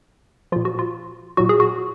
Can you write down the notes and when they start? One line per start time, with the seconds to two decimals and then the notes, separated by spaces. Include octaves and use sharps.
0.52 A#2 F3 F4
0.65 F#4
0.79 F4
1.37 A#2 F#3 F#4
1.49 G#4
1.60 F#4